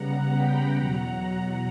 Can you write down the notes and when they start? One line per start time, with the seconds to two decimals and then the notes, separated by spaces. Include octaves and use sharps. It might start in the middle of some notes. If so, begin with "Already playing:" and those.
Already playing: C#3 G3 B3 F#5 A#5
0.33 G5 B5
0.75 E2 B2 F#3 F#5 A#5